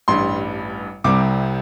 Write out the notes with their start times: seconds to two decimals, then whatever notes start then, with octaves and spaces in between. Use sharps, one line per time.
0.08 A1 G2 G3 C6
1.04 C2 C3 G3 C4 D6